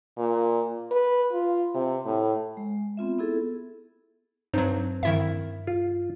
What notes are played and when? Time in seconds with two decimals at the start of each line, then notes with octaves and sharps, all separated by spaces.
0.18 A#2
0.91 B4
1.33 F4
1.74 C3
2.05 A2
2.57 G#3
2.97 B3 C4 F4 E5
3.18 B3 E4 G#4 A4
4.54 G2 F#3 C4 D#4
5.03 G2 D#3 E4 E5
5.67 F4